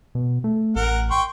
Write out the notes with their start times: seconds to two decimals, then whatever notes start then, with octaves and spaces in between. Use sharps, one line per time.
0.15 B2
0.44 A3
0.76 A1 A#4 F#5
1.11 G5 C6 C#6